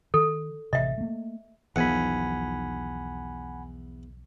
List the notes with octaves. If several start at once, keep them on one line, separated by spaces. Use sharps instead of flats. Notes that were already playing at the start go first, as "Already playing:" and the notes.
D#3 A4
A1 C3 D#5 E5
A3 A#3
B1 E2 D#3 F3 F#5 G#5 B5